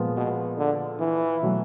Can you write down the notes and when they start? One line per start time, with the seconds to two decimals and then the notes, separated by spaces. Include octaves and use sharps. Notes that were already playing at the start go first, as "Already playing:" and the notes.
Already playing: A#2 F3 G#3 B3
0.16 B2
0.58 D3
1.00 E3
1.42 B2 F#3 A3